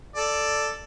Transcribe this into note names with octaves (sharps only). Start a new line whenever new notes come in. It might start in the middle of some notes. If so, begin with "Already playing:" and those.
A4 D5